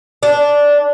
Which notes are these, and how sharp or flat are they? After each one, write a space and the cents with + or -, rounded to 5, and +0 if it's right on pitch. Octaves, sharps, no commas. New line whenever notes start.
D4 -10